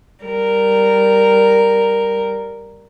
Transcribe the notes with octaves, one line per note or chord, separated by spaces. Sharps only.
G3 A#4